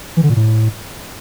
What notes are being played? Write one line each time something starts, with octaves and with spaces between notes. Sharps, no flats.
E3
D3
A#2
A2